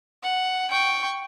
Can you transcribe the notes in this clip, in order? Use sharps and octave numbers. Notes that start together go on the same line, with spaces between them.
F#5
G5 C#6